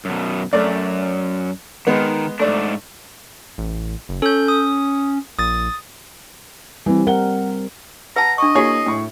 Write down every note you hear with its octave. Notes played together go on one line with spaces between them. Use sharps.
F#2 B2
F#2 A3 D5
D#3 G#3 B3
G#2 A3 D4 D5
A1
F#1
C#4 A4 G6
D#6
A#1 D#6 A6
E3 G3 C4
A#4 F#5 G7
B4 F#5 A5 A#5
D4 D#5 C#6
A#3 E4 F#4 G#4 C#5
A2 C#6